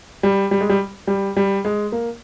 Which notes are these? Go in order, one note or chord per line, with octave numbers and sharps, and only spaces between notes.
G3
G3
G#3
G3
G3
G3
G#3
A#3